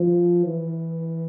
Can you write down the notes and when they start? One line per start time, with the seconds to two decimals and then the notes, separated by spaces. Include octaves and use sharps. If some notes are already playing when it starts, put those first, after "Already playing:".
Already playing: F3
0.46 E3